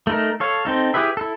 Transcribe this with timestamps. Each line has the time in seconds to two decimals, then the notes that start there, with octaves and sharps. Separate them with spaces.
0.07 A3 D#4 A#4
0.40 A4 C#5 F5
0.65 C4 D#4 A4
0.94 E4 G4 G#4 B4 E5
1.17 E4 A4